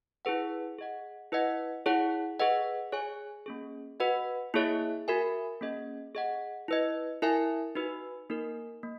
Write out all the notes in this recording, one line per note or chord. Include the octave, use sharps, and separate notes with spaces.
E4 G#4 B4 F#5
G#4 D#5 F#5
E4 B4 D#5 F#5
E4 G#4 C#5 F#5
G#4 B4 D#5 F#5
G#4 C#5 G#5
A#3 C#4 G#4
F#4 B4 D#5 F#5
A#3 E4 G#4 C#5 E5
F#4 A#4 E5 G#5
A#3 C#4 G#4 D#5
G#4 D#5 F#5
E4 B4 D#5
E4 A#4 E5 G#5
D#4 F#4 B4
A#3 D#4 A#4
A#3